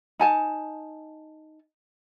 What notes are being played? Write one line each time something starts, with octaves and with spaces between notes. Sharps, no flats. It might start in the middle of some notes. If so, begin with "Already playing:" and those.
D#4 G#5 A5